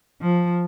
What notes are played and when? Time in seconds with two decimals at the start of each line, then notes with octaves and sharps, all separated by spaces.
0.22 F3